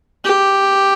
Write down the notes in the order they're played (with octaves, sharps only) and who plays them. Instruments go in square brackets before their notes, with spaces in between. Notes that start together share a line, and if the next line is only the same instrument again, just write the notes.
[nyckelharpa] G4